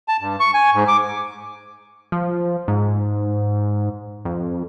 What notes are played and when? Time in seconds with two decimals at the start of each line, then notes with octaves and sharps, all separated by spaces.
0.08 A5
0.21 G2
0.40 C#6
0.54 G#5
0.74 G#2
0.88 D6
2.12 F3
2.68 G#2
4.25 F2